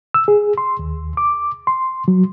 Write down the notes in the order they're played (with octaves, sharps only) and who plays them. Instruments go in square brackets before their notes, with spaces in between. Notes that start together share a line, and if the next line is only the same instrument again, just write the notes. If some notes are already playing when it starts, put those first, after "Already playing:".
[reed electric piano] E6
G#4
C6
D#2
D6
C6
F#3